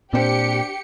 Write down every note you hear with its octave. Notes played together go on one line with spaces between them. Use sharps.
A#2 C4 D4 G4 C5 C#7